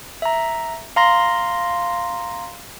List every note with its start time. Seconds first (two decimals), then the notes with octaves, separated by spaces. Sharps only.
0.22 E5 A#5
0.96 F5 A#5 C6 A#6